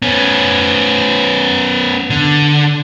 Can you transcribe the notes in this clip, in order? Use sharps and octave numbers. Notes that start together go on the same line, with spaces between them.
B3 C#4
D3